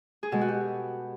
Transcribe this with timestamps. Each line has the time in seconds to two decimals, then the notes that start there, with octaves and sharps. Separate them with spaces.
0.23 G#4
0.32 B2 G#3 A4
0.41 F#4
0.48 G4